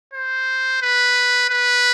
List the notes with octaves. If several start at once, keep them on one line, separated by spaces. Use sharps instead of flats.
C5
B4
B4